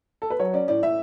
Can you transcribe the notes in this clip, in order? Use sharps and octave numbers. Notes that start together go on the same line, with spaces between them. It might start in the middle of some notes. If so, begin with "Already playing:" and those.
A4
B4
F#3 C#5
C#4 D5
A2 D5
A2 E5